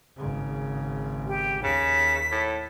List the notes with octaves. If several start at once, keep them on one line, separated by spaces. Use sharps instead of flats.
G#1 C#3
G4
D#2 C#3 B6
A2